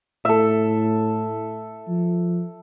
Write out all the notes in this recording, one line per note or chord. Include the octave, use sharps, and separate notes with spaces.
A2 A4 E5
F3